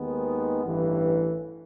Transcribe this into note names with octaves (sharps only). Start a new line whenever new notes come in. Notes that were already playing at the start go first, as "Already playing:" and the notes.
Already playing: D#2 D#3 G#3 B3
A1 G2 E3